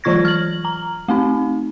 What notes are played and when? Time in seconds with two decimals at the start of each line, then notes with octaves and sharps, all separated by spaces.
0.04 E3 F#3 F4 C#6 G#6 A#6
0.25 F6 F#7
0.65 A#5
1.08 A3 C4 D#4